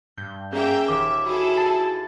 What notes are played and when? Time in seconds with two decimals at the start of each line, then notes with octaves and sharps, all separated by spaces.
0.17 G2 G6
0.52 A#3 C#4 G#4 E5 G5 G6
0.88 D#1 D#2 E5 D6
1.26 E4 F#4 G#4 A4
1.56 A5 C7